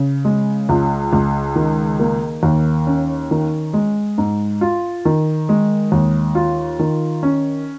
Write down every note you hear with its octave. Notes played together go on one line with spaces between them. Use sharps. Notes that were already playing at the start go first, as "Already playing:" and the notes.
Already playing: C#3
G#3
C#2
C#2
D#3
A#3
D#2
C#4
D#3
G#3
G#2
F4
D#3
G#3
D#2
F4
D#3
C#4